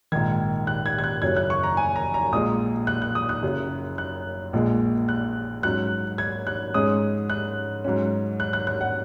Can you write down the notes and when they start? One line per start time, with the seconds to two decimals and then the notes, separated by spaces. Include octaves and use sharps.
0.12 A#1 G#2 D#3 G#6
0.67 F#6
0.86 G#6
0.99 G#6
1.04 F#6
1.22 F#1 F#2 F#3 C#4 G#6
1.37 F#6
1.50 C#6
1.63 A#5
1.77 G#5
1.96 A#5
2.14 A#5
2.32 A#1 A#2 G#3 D#6
2.87 F#6
3.02 F#6
3.15 D#6
3.29 F#6
3.43 F#1 F#2 C#3
3.98 F#6
4.53 A#1 A#2 G#3
5.09 F#6
5.63 G#2 F#3 C#4 F#6
6.18 G#6
6.47 F#6
6.74 G#2 G#3 C#4 D#6
7.30 F#6
7.84 G#2 F#3 C#4
8.40 F#6
8.53 F#6
8.67 F#6
8.81 F#5